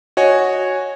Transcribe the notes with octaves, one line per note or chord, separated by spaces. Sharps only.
F#4 C#5 D#5 G#5